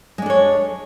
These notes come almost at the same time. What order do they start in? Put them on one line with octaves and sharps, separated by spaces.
G#3 D4 A4 C#5